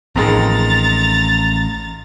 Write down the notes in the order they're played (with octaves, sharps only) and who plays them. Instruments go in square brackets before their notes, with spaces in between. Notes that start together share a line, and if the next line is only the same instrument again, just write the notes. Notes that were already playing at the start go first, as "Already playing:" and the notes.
[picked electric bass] A1 [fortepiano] F2 D#3 G#3 [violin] A#5 A6